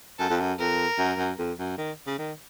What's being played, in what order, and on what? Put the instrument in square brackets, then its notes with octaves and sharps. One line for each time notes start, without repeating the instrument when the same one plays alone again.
[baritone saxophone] F#2 [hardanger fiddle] A4
[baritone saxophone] F2
F#2
[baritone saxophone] F2 [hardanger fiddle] A#4
[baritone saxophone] F#2
F#2
F2
F#2
D#3
C#3
D#3